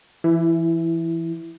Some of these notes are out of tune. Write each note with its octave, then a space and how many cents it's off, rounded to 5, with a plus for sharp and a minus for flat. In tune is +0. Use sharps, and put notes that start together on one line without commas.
E3 +25 E4 +0